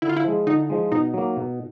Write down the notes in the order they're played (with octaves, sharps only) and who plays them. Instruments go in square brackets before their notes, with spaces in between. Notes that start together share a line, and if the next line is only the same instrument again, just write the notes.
[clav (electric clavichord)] D3 [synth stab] E4
[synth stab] F4
E4
[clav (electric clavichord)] F3 G#3
[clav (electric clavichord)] D3 [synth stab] D#4
[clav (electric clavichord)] F3 G#3
[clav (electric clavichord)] B2 [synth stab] D#4
[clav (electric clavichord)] F#3 A#3
B2